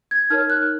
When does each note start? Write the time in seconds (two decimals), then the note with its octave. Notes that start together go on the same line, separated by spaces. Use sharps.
0.11 G#6
0.30 D#4 A#4 C#5 F6
0.50 F#6